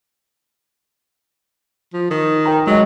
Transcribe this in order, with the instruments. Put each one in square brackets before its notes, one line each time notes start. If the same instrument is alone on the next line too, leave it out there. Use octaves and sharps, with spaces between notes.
[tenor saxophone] F3
D#3
[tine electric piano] A#4 G5 A#5
[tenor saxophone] F#3 [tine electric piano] G#3 D#5